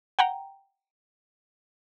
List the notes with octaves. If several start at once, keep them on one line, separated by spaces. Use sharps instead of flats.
F#5 G5 A#5